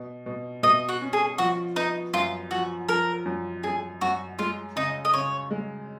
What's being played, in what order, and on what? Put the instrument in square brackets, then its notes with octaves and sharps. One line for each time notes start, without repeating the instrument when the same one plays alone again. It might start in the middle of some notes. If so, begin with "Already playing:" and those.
Already playing: [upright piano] B2
B2
[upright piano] B2 [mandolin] D#5
[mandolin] F#4
[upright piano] C#4
[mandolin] G#4
[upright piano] F3 [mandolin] F#4
[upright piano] B3 [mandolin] D#4
[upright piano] F#2 [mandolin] F4
[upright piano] F3 [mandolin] F#4
[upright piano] F3 [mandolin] A#4
[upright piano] F#2
[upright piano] F#2 [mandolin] G#4
[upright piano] F#2 [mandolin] F#4
[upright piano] G#3 [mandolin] F4
[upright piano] C#3 [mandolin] D#4
[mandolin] D#5
[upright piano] C#3 [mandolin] C#5
[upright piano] G#3